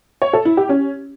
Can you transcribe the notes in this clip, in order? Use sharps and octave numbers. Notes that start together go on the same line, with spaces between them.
C#5
A4
E4
G4
C#4